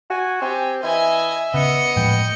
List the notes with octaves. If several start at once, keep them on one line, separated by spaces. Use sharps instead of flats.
F#4 G#5
C4 G4 G#5
E3 D#5 E5 G#5
C#3 B3 D#5 C#7
A2 F3 G#3 G5